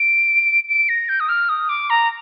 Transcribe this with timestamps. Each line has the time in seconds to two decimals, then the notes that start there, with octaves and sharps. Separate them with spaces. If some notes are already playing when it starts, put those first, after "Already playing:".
Already playing: D7
0.69 D7
0.89 A#6
1.09 G6
1.20 D#6
1.29 F6
1.49 D#6
1.69 D6
1.90 A#5